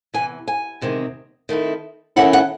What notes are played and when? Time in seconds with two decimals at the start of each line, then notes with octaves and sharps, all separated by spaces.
0.14 E2 C3 E3 G#5
0.48 G#5
0.81 E2 C3 D#3 G#3 C4
1.49 D#3 A3 C4 E4
2.16 E2 D#3 A3 C#4 E4 F#5
2.33 F#5